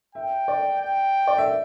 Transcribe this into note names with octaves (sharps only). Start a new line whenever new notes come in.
E5 G5
D5
G5
D5
E5